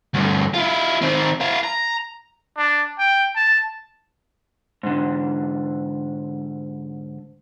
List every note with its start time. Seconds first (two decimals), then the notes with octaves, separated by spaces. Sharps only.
0.14 D2 G2
0.54 E4 F4
1.02 D#3 C4
1.41 E4 F5
1.64 A#5
2.58 D4
2.99 G5
3.36 A5
4.83 G#2 D3